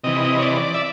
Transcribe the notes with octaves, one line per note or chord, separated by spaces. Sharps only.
C3 E3 D#5
C#5
D5
E5